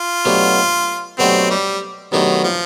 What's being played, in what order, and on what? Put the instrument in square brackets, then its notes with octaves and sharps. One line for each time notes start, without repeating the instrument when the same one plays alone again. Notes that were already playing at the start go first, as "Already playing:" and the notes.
Already playing: [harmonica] F4
[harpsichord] B2 F#3 A3 D4 G4
[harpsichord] B2 F#3 A3 D4 G4 [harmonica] C4
[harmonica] G3
[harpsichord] B2 F#3 A3 D4 G4 [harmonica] D#3
[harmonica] F3